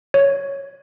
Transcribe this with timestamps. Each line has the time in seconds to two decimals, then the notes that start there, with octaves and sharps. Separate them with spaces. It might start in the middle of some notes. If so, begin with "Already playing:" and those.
0.14 C#5